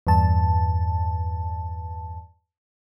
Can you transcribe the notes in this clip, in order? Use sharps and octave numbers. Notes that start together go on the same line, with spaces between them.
E2 G2 A5